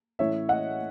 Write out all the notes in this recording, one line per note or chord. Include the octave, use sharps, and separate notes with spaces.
A2 E3 A3 C#4 E4 C#5 E5
D#5 F#5